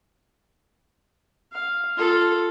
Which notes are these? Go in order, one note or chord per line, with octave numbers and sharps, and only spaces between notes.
F5
F4 A4